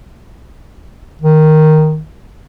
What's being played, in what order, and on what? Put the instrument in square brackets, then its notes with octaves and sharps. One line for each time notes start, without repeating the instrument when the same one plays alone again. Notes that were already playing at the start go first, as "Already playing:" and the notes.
[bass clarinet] D#3